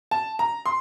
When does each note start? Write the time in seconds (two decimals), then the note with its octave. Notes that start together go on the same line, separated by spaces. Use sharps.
0.11 A5
0.39 A#5
0.66 C6